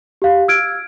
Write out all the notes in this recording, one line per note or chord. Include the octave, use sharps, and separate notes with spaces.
G4 F5
E6 F6 G#6 D7